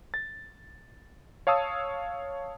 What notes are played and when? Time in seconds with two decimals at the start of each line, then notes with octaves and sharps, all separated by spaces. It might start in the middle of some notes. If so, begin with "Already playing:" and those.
0.14 A6
1.47 C#5 F5 A5 D#6 E6